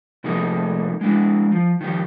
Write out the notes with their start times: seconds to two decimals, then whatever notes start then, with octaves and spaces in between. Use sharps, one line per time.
0.24 C3 F3 A3 A#3 D#4 G#4
1.01 G#3 D4 E4
1.52 F3
1.81 D#3 F3 G4